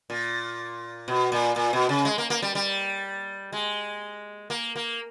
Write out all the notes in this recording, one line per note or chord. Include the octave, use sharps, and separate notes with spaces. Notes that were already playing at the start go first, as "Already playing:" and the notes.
A#2
B2
A#2
A#2
B2
C#3
G#3
A#3
A#3
G3
G3
G#3
A#3
A#3